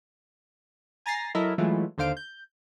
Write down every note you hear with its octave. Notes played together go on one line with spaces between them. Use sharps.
G#5 A#5 A6 A#6 C7
F#3 E4 A4 A#4 D#5 E5
E3 F#3 G#3 A3 E4 F4
D#2 D3 C5 F5 D7
G6